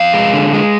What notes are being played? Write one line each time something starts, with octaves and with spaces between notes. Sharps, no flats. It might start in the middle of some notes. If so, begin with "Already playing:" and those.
Already playing: F2 F5
G#3
D3
G#3